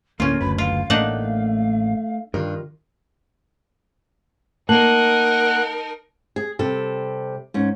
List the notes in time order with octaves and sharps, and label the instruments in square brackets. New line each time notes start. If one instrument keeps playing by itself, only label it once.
[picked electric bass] D2 A2 [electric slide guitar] A#3 [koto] C#4 F4 [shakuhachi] A#4
[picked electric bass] F#1 D2 [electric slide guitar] B4 [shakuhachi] B5
[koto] F4 [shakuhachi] F5
[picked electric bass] A1 A2 A#3 [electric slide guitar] A3 [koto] D4 D#4 F#5
[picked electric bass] G2 [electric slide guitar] D#3 F4 A#4
[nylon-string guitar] A#3 [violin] D#4 A#4 [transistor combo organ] F#5 [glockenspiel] A5 F#7
[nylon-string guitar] G#4
C3 G3 A4
G#2 C#4